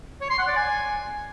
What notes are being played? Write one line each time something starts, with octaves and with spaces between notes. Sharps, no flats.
C#5
C6
F#5
D5
G#5